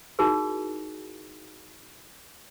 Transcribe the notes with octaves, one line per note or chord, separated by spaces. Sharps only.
D#4 E4 F#4 G#4 A#4